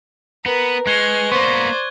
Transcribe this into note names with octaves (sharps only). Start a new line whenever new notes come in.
B3 A#4 B4
G#3 C#6 F6 F#6 G#6 G7
A#3 B3 C5 D5 C#6